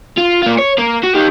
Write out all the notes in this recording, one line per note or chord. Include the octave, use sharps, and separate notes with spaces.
F4
A#3 F4
C#5
A#3
F#4
D#4 G4